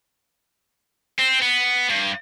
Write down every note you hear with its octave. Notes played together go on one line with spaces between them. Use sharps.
C4
B3
G2